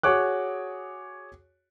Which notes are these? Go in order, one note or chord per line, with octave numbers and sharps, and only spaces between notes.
F#4 G#4 C#5 D6 F#6